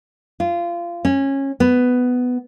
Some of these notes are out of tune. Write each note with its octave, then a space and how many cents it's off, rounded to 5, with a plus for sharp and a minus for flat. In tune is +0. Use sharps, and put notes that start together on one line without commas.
F4 -20
C#4 -20
B3 +10